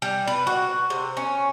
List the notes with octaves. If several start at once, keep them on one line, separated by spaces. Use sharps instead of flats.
G3
B4
F#4
C3
C#4